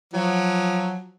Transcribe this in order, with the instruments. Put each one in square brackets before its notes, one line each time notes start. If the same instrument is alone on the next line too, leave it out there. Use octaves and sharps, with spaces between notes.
[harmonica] F3 F#3